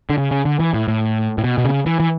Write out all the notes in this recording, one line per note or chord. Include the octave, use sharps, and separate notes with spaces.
D3
C#3
C#3
D3
E3
A2
A2
A2
B2
B2
C#3
E3
E3